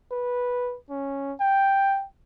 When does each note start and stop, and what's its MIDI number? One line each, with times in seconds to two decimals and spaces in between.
0.11 0.77 71
0.90 1.33 61
1.40 2.05 79